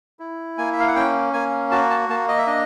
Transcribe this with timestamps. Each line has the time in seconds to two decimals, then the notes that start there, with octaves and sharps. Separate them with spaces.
0.19 E4
0.58 A#3 G#5
0.73 E5
0.80 F5
0.87 F#5
0.95 C#4 G5
1.33 A#3 G#5
1.71 F#4 A5
1.90 A5
2.09 A#3 A5
2.28 D#5
2.38 E5
2.47 D4 D#5